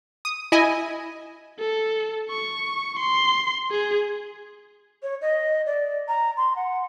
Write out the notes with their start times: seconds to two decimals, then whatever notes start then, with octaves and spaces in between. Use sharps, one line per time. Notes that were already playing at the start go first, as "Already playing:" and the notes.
0.25 D#6
0.52 E4 D#5 G#5
1.60 A4
2.30 C#6
2.99 C6
3.71 G#4
5.03 C#5
5.21 D#5
5.66 D5
6.08 A#5
6.37 C6
6.56 F#5